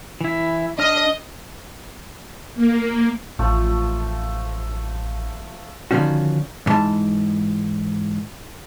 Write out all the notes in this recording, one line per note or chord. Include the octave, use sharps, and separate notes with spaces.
E3 E4
D4 D#5 F6
A#3
A1 F3 A3
D3 D#3 F3 C#4 F#4
E2 G#2 E3 G#3 A5